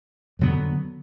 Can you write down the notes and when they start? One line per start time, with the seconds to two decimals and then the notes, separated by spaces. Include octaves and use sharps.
0.39 F2 D3 F#3 B3